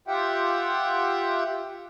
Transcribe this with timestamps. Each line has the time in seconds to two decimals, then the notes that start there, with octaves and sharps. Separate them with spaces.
0.08 F4 G4 E5 F#5 G5